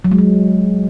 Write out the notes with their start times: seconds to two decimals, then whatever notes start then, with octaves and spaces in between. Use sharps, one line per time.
0.05 F#3
0.12 G#3
0.19 F#3